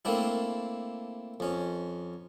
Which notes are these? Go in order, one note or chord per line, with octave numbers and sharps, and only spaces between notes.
A3 A#3 C4 D4 E4
F2 C#4